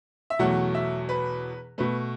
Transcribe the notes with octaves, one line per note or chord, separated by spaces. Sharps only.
E5
E2 B2 F#3 A3 F#5
E5
B4
B2 A3 B4